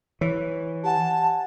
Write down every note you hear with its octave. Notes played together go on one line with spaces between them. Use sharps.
E3 C#5
G4 F#5 G#5 A5